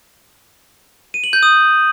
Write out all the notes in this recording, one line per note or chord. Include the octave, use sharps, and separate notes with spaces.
D#7
F#7
G6
D#6